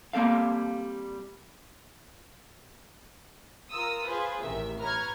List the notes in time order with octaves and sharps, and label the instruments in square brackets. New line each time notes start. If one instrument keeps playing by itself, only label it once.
[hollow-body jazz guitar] G3 A#3 C4 A4 F5
[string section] F4 A#4 D#6 E6
F4 G#4 B4 C5
A1 C3 D#3 E5
B4 C#5 A#5 C#6 F6 G#6